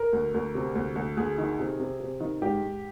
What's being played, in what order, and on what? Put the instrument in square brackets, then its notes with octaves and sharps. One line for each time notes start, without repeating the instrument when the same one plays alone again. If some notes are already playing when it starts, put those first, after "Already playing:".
Already playing: [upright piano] A#4
D2
D2
C3
D2
D2
D2 G#4
D#3
C3
C3
C3
D#3
G#2 G4
G#2